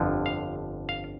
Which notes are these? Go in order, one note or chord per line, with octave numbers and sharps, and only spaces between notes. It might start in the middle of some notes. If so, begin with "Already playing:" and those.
Already playing: G1 F2 D3 F3
F5
F5